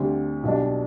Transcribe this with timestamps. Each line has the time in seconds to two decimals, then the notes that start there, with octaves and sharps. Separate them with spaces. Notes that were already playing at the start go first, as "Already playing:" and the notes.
Already playing: D2 D3 G3 C4
0.43 B1 B2 G3 D4